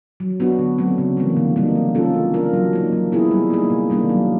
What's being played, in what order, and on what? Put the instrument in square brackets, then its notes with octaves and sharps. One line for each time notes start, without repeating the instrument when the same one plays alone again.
[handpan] F#3
B3 D4 F#4
D3
F#3 A3 C4
C#3
E3 G3 A#3
D3
G3 A#3 D#4
G#3
C#4 F4 A4
A3
D4 F4 A#4
F#3
A#3 D#4
F#3
B3 E4 G#4
G3
A#3 D#4 G#4
C3
D#3 G3 A#3 D4
F#3